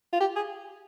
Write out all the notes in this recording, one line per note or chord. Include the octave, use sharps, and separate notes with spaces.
F4
G4
G#4